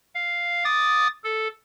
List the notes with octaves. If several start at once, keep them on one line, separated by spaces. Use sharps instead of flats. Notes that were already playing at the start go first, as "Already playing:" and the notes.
F5
D6 D#6 A6
A4